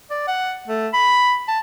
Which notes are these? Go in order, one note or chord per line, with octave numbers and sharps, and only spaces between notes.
D5
F#5
A3
B5
A5